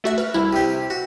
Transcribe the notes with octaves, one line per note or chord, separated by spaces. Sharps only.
A3 F#4 E5
B4 F6
C2 E4 F6
C3 G4
F#4